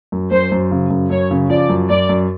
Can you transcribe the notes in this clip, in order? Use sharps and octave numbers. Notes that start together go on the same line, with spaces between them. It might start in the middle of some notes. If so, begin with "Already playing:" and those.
F#2
F#2 C5
F#2
C#3
F#2
F#2 C#5
C#3
F3 D5
F#2
F#2 D5
F#2